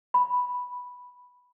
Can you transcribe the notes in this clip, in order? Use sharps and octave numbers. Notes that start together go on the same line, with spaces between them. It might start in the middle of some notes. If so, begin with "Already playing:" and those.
B5